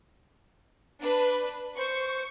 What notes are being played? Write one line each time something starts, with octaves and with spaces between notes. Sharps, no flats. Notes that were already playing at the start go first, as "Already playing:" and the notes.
D4 B4
C5 C#6